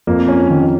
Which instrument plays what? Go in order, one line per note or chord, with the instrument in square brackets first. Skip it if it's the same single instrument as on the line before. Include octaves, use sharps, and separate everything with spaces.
[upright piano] F2 [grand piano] A#3
[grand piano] C#4
D#3